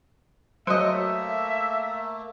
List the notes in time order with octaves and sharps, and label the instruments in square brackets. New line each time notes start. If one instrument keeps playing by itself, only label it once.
[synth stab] F#3 [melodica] A3 A#3 [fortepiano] C5 D#5 [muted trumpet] E5